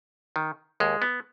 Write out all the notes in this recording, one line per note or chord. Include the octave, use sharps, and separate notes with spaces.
D#3
D#2 G#3
B3